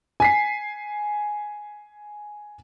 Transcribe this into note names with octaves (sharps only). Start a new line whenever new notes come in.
G#5 B6 C7